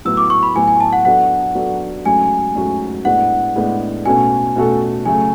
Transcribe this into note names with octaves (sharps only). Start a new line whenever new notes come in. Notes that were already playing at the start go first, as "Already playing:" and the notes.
A2 F#3 B3 F#4 E6
D6
C#6
B5
A2 F#3 B3 F#4 G#5
G#5
A5
F#5
F#3 B3 D4 F#4 A4 F#5
F#3 B3 D4 F#4 A4
G#2 F#3 A3 C#4 F#4 G#5
G#2 F#3 A3 C#4 F#4
A2 G#3 B3 D4 F#5
A2 G#3 B3 D4
B2 A3 C#4 F#4 A4 G#5
B2 A3 C#4 F#4 A4
C#3 F#3 A3 G#5